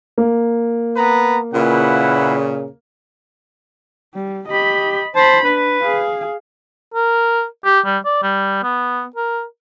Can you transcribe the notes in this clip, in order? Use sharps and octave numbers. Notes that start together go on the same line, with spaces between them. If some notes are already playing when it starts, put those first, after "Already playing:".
A#3
B3 B4 A#5
A#2 C#3 E4 B4 F#5
G3
G4 D#5 B5
C5 A5 B5
D4 B4
G#4 F5
A#4
G4
G3
D5
G3
B3
A#4